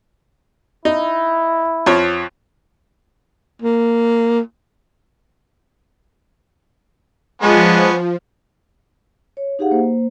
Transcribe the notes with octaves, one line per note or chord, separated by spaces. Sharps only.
D#4 E4
F2 F3 C#5
A#3
F3 G#3 B3 C#4 D4
C#5
D#4 G4 G#4 F5 F#5
A#3 C5